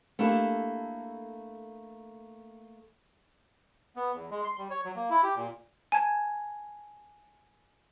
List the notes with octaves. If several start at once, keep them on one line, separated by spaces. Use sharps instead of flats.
A3 A#3 D4 E4 G4 A4
B3
E2
G#3
C6
G3
C#5
F#3
A#3
E4
G4
A#2
G#5 A5 G#6